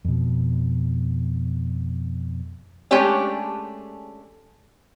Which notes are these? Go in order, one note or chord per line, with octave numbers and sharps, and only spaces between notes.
F2 B2
G#3 A3 C#4 D4 G4 D5